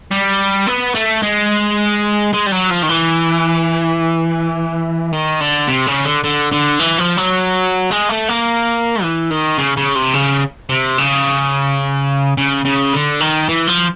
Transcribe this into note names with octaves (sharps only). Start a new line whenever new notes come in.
G3
B3
A3
G#3
G#3
G3
F#3
F3
D#3
E3
D#3
D3
C3
C#3
D3
D3
D3
E3
F3
F#3
G#3
A3
A#3
E3
D#3
C#3
C#3
C3
C#3
C3
C#3
C#3
C#3
D3
D#3
E3
F3